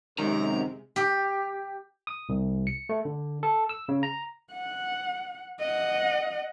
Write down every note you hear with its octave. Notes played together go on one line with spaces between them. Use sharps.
F#2 C3 D#3 G#3 A#5
G4
D#6
C2
C#7
A3
D3
A4
E6
C#3
A#5
F#5
D#5 F#5